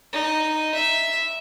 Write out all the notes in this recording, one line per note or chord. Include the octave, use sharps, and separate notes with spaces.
D#4
E5